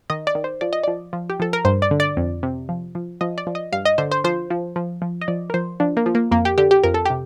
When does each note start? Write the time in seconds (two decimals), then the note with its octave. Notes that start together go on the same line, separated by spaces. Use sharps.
0.10 D#3 D#5
0.27 D5
0.35 D#3
0.44 C5
0.61 F3 D5
0.73 D#5
0.83 F3 D5
1.13 F3
1.30 G4
1.40 F3 A4
1.53 A#4
1.65 G2 C5
1.82 D5
1.91 D3
2.00 D5
2.17 F2
2.43 C3
2.69 F3
2.95 F3
3.21 F3 D#5
3.38 D5
3.47 F3
3.55 D#5
3.72 G2 F5
3.85 D#5
3.98 D3 C5
4.11 C5
4.24 F3 C5
4.51 F3
4.76 F3
5.02 F3
5.21 D#5
5.28 F3 D5
5.50 A#4
5.54 F3 C5
5.80 F3 D4
5.97 A#3
6.06 F3
6.15 A#3
6.31 F2 A#3
6.45 G4
6.58 D3 G4
6.71 G4
6.84 F2 A#4
6.94 A4
7.06 C3 G4